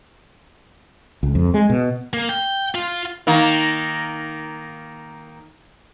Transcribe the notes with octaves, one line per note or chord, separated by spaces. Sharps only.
C#2
F2
G#3
B2
A#3
G5
F4
D#3 A#3